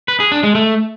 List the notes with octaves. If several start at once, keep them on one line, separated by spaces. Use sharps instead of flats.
B4
G#4
D4
G#3
A3